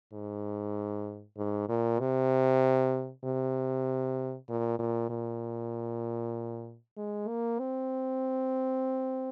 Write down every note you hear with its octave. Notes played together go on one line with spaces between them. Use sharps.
G#2
G#2
A#2
C3
C3
A#2
A#2
A#2
G#3
A#3
C4